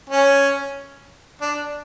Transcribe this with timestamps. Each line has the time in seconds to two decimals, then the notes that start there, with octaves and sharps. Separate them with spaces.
0.09 C#4
1.41 D4